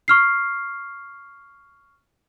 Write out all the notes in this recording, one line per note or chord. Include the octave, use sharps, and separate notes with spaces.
C#6 F6 C7